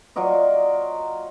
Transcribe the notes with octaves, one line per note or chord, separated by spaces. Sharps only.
F#3 F4 D5 D#5